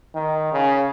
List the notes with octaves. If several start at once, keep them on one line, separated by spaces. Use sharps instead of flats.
D#3
C#3